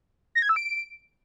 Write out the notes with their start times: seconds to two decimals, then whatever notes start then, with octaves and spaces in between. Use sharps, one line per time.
0.35 A#6
0.42 G#6
0.49 E6
0.56 D7